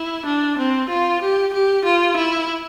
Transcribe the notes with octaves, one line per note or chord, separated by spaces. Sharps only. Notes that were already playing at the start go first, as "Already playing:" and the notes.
Already playing: E4
D4
C4
F4
G4
G4
F4
E4